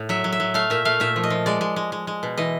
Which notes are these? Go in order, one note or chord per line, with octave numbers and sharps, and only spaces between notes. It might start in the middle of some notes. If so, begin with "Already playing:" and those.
Already playing: A2
F#3 E5
F#3
E5
F#3
A3 F5
A#2 E5
A3 F5
A#2 E5
F3
D#5
F3
G#3 D5
G#3
G#3
G#3
G#3
B2
E3 D#5